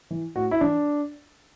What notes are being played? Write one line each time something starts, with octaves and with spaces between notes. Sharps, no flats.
E3
A2 F#4
E4
E3 D4